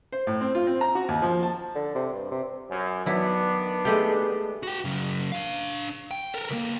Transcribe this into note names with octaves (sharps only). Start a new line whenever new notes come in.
C5
A2
C4
F4
C4
A#5
F#4
D#2
F3
A5
D3
C3
G2
C3
F#2
D#3 F#3 B3 D4 E4
G#3 A3 G4
F#4 G5
F#2 C#3
D4 F5
G5
A4 A#4
C#2 A#3